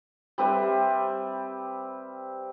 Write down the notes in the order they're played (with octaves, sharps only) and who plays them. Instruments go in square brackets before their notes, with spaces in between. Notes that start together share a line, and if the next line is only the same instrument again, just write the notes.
[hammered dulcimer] G3 C4 B4 E5